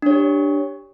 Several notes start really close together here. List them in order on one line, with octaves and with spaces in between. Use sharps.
D4 C#5 G4